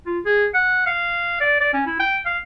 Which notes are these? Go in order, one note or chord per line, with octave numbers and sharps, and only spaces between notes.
F4
G#4
F#5
F5
D5
D5
C#4
E4
G5
F5